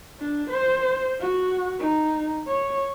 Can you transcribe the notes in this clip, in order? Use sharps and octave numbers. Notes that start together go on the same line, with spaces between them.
D4
C5
F#4
D#4
C#5